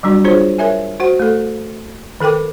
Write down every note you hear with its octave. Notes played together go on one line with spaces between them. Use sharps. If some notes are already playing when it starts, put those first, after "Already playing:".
F#3 G3 D4 F#4
D4 F4 G#4 C5 C#5
A#4 C#5 E5 G#5
F#4 C5 F#5
A3 A4
D#3 A4 A#4 G5 D6